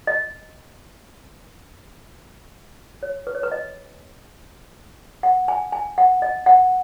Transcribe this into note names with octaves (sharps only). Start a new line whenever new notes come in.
D#5
C#5
B4
C#5
B4
D#5
F#5
G#5
G#5
F#5
D#5
F#5